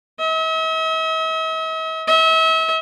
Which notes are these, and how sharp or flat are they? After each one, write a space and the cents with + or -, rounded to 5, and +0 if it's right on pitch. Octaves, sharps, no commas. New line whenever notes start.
E5 -45
E5 -40